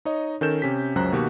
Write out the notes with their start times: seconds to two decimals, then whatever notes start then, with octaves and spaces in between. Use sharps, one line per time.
0.05 D#4 C#5 D#5
0.41 D#3 C#4 A4 A#4 G6 E7
0.62 C3 C#4 G4 B6
0.96 C#2 F#2 F#3 C5 A#5 F#6
1.12 B2 D#3 A#3 F#4 G4